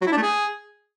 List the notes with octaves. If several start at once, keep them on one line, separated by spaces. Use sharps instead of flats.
F#3
E4
D4
A3
G#4